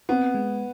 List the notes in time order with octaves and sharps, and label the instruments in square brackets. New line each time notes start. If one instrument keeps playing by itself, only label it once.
[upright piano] B3 [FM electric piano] C4
[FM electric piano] G#3